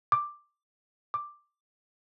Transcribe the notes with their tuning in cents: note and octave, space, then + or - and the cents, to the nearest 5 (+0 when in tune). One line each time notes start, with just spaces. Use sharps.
D6 +5
D6 +5